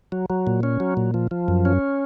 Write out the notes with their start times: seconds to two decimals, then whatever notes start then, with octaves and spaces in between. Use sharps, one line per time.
0.12 F#3
0.30 F#3
0.47 A#2
0.63 C#4
0.80 F#3
0.97 A#2
1.14 F3
1.31 F3
1.48 F#2
1.65 C#4